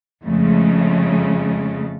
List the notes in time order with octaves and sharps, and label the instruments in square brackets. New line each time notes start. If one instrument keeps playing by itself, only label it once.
[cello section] F2 C#3 G#3 A3